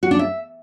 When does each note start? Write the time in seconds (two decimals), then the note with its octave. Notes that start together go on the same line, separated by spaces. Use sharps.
0.03 F#4
0.11 D4
0.19 E5